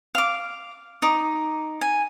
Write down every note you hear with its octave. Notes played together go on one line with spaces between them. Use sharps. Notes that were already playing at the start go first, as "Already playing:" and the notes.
F5 D6
D#4 D6
G#5